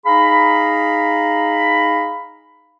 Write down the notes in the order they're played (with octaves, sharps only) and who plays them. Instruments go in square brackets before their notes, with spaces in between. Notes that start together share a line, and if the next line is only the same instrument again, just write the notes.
[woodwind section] D#4 G#4 F5 A#5 B5